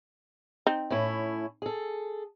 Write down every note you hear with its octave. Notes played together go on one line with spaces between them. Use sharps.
C4 D#4
A2 C#4 E4
G#4 A4